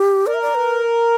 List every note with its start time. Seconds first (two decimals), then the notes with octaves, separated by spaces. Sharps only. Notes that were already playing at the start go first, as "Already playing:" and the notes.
Already playing: G4
0.27 A#4 D5
0.34 E5
0.42 D5
0.55 B4